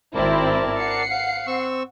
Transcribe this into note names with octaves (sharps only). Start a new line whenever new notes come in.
G#1 C4 E4 A#4 D5 A5
F#5 C7 C#7
F5
C4 C#6 E6